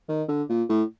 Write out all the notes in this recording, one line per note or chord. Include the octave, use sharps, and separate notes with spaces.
D#3
D3
A#2
A2